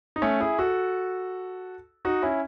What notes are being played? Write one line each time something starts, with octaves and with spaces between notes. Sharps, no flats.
D#4
A3 C#4
E4 G#4
F#4 A4
D#4 F#4
C#4 E4